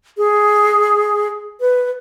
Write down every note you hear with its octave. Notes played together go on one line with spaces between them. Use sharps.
G#4
B4